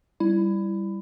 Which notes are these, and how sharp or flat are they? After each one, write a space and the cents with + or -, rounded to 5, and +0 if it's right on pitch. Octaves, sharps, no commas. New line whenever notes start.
G3 +0 E4 +15